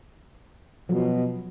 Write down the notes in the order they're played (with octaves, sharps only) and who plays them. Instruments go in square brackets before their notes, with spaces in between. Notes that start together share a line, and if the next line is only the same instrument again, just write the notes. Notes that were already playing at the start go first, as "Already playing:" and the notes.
[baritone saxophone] B2 [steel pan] F3 F#3